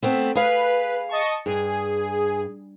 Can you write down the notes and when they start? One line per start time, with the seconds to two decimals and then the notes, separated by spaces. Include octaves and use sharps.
0.02 A3 B3 C4
0.35 G#4 B4 F5
1.09 D#5 A5 C#6
1.46 G2 G#4